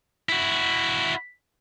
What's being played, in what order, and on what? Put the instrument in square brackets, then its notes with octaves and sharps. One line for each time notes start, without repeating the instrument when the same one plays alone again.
[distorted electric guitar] E4 F#4